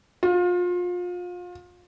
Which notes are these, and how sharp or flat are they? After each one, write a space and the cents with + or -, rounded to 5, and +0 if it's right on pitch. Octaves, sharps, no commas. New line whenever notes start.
F4 +30